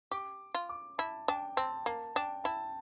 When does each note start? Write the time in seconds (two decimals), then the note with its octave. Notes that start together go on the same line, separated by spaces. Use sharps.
0.11 G4 D6
0.54 F4
0.69 D6
0.98 E4 A5
1.28 D4 G5
1.57 C4 A5
1.86 A#3 A5
2.15 D4 G5
2.44 E4 A5